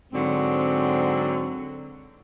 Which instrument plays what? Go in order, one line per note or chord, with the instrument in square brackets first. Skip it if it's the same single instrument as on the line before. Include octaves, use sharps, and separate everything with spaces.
[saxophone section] G#2 D3 F#3 C4